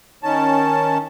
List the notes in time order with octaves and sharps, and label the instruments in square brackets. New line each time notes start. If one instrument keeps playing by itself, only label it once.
[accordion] D#3 C#4 A5